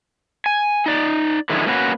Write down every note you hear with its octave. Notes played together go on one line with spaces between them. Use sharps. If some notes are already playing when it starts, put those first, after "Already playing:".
G#5
D#4 D5
D3 D#3 F3 G#3 E4
A#3 C#4 F#4 B4